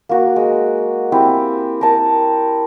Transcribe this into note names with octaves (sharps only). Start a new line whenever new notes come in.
A#3 F#4
G#3
C4 E4 G4
A#4 A5